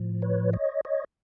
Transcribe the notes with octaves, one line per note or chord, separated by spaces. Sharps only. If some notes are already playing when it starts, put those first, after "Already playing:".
Already playing: A2 F3
B4 C#5
C#5 D#5
C#5 D#5